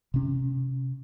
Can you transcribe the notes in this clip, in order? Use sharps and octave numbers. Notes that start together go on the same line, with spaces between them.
C3 C#4